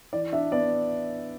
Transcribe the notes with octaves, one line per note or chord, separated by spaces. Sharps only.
E3 D5
D4 E5
B3 D5